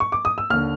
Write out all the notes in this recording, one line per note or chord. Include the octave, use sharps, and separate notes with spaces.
C#6
D6
D#6
E6
D#2 D3 F6